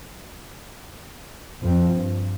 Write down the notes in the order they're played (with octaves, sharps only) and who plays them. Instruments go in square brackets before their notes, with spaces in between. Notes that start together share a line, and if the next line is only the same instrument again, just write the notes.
[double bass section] F2 F3 C4
G2